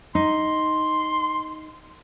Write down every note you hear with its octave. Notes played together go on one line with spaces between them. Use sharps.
D#4 C6